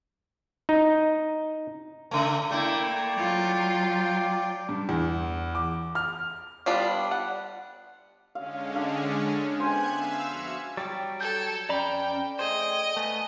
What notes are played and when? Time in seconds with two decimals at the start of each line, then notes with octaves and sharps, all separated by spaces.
0.69 D#4
2.11 C#3 A3 A#4
2.51 A3 A#3 E4 D5 G5
3.18 F#3 F4
4.69 G2
4.89 E2
5.55 D6
5.95 F6
6.66 G3 B3 D4 F4 D5
7.11 F#5
8.35 D3 G#3 C#4 F5
8.76 D4 F5
9.60 B3 C5 G#5 F#6 G#6
9.91 E5 F5 E6
10.24 F2 F#4 C#7
10.77 F#3 G3 G5 A6
11.20 A4 G6 G#6
11.69 F2 C#4 D5 G5 A#5 B5
12.39 A3 G#4 C5 D#5 G5
12.97 A3 B3 G#5